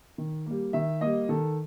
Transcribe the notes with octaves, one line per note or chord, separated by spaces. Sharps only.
D#3
G3 A#3
D#3 E5
G3 A#3 D#5
D#3 A4